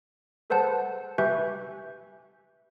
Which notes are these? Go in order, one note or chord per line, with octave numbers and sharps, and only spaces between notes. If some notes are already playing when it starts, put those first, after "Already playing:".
G#4 A4 B4 C5 F#5 A5
G4 B4 E5 G#5 C#6 G6